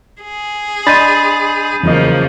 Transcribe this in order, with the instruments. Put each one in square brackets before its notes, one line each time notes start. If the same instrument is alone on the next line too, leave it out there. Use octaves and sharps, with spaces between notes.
[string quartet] G#4
[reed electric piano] D4 D#5 C6 [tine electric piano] B5 A6 [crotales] D#6 G6 D#7
[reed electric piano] E2 F#3 D#5 [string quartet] C#3 F3 A#3